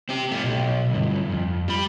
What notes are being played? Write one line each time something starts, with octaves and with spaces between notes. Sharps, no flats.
C4 G4
A3 G4
B1
D2 G2
F2
G3 B5